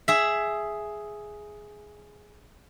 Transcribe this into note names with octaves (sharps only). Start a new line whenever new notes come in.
G#4 E5